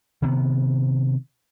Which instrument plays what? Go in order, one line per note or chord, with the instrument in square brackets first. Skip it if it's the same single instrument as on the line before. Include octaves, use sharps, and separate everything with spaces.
[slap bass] C3 D#3 B3